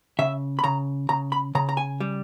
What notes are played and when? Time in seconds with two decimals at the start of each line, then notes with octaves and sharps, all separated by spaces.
0.19 C#3 E5
0.59 B5
0.64 C#3 A#5
1.09 C#3 A#5
1.32 B5
1.55 C#3 A#5
1.69 A#5
1.77 G#5
2.00 G3